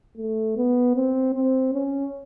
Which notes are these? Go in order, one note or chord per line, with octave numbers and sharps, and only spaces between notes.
A3
B3
C4
C4
C#4